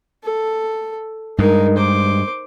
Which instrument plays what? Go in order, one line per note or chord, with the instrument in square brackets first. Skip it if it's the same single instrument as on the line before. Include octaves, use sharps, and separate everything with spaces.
[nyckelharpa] A4
[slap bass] G2 G#3 [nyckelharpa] D#4 A#4
[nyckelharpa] C5 D6